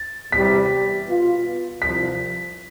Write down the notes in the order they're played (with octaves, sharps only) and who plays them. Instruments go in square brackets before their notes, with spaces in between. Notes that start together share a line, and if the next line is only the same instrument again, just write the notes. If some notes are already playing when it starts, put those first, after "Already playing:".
Already playing: [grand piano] A6
[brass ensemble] E2 C3 G3 [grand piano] B6
[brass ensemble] B2 B3 F4
[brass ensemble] C2 C3 F3 [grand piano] B6